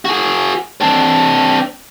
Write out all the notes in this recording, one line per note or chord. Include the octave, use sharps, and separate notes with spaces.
F#4 G#4
C4 D4